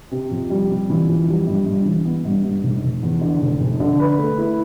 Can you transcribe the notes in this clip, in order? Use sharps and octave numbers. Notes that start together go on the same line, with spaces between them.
C3
F2
G3
C3
E3
F2
G3
G2
G2
E3
B3
G2
G2
F1
F1
E2
D3
F1
F1
D3
B4
A3
E4